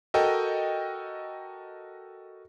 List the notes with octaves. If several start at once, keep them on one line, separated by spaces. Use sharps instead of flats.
F#4 A4 A#4 D#5 G5